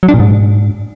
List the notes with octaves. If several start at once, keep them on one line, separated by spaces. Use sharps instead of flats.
F#3
D4
A#2
G#2